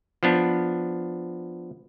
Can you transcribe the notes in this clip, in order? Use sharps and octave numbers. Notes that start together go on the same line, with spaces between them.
F3 B3 D4